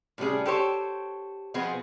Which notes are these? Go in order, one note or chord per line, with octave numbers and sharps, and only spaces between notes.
A2 C3 G3 C#4 G#4
G4 A4 C5 C#5
B2 F3 B3 C4 G#4 G#5